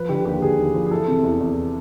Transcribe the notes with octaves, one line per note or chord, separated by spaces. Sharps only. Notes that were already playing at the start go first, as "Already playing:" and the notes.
Already playing: F3 B4
D3 G4
D#2 G4
D3 G#4
D#2
F3
G#4
E3 A4
C3
E2
E2